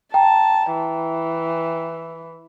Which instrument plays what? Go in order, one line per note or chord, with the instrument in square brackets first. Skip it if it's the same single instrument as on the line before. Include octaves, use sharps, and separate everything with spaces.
[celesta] G5 A#5 [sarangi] A5
[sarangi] E3